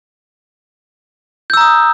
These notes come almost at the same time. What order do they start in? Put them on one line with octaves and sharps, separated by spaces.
G6 E6 A#5 D#6